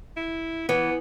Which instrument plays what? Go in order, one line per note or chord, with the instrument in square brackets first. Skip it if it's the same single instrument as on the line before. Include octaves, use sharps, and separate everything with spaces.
[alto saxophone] E4
[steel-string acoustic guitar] E3 [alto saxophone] B3